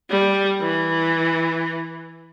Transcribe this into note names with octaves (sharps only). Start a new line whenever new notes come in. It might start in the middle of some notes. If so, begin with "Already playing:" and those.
G3
E3